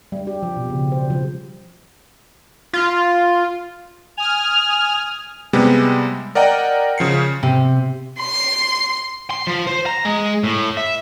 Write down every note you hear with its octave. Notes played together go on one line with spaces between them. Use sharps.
G3
G4
F3
B2
C#3
C5
F3
F4
G#5 D#6 F6 F7
C3 G3 G#3 B3
A#4 D5 D#5 F#5 G5 A#5
C#3 F3 C7 C#7
C3
C6
C6
F3
C5
A#5
G#3
A2
E5